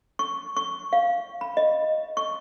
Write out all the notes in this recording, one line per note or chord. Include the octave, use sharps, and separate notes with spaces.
C#6
C#6
F5
B5
D#5
C#6